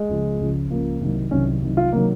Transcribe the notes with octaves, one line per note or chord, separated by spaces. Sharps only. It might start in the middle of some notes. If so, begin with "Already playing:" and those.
Already playing: G#3
C#2 C#3 F3
C#2 C#3 F3
C#2 C#3 F3 A#3
C2 C3 D#3 F#3
C2 C3 D#3 F#3 C#4
C2 C3 D#3 F#3
F4
C3 D#3 F#3 A#3